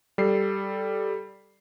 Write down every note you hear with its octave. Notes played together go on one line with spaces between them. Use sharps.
G3 A4 C7